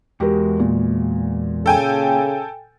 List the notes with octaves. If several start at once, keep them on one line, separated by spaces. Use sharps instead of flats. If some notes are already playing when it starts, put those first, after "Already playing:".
E2 G#3 F#4 G4 A#4
A#2
C#3 A4 G5 G#5